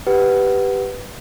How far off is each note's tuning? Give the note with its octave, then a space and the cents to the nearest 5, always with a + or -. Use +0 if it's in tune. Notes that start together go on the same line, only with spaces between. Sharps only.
G4 +0 B4 +0 F#5 +15